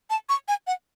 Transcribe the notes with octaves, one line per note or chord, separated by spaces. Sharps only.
A5
C#6
G#5
F#5